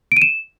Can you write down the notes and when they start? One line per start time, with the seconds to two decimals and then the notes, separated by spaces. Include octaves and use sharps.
0.12 D7
0.17 D#7
0.22 E7